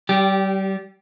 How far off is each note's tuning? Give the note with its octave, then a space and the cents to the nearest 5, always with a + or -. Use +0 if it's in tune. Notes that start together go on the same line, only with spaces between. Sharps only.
G3 -30 G4 +0